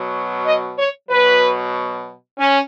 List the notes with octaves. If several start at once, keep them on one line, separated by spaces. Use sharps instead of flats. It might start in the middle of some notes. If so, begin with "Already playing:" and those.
Already playing: B2 F#3
D#5
C#5
B2 F#3 B4
C#4